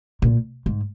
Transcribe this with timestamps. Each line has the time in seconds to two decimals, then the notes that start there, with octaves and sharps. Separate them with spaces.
0.22 A#2
0.66 G#2